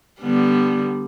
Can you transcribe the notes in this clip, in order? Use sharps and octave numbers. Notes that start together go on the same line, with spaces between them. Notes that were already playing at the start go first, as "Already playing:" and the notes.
D3 G3 B3